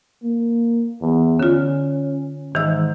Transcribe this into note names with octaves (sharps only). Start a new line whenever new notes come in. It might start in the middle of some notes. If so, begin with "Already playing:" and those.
A#3
E2
D3 C#4 F4
G#2 D#3 E3 E6